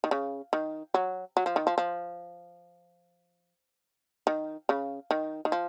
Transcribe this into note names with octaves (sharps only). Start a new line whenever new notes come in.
D#3
C#3
D#3
F#3
F#3
F3
D#3
F3
F3
D#3
C#3
D#3
D#3
F3